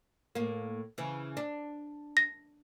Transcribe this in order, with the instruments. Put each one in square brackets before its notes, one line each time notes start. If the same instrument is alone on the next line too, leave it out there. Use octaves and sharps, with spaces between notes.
[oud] A2 A#3
C#3 E3
D4
[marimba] A#6